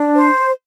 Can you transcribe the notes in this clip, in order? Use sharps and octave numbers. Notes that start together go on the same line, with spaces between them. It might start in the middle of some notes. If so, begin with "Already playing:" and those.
Already playing: D4
C5